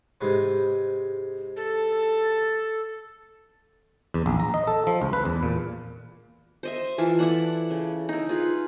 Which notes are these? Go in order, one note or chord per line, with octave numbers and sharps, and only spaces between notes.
G#2 C3 B4
A4
E2
A#1
A#5
D#5
A4
F3
C#2
B4
E2
A#2
C5 D#5 E5
E3 E4 F4 A5
E4 A4 D5 F#5
C#3
D#4 E4
F4 G#4 B4